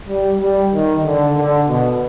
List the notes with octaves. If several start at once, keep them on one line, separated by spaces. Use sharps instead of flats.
G3
G3
D#3
D3
D3
B2